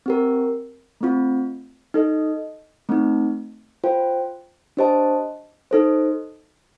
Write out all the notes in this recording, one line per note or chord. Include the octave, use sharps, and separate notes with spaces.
C4 G4 A#4
A3 C4 F4
D#4 A4 D#5
A3 C4 D#4
F4 C5 G5
D4 G4 C5 D#5 A5
D#4 A4 C5